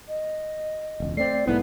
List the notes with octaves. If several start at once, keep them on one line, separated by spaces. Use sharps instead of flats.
D#5
E1 C#2
A3 C4 D5 C7
B1 G#2 A3 B3 E4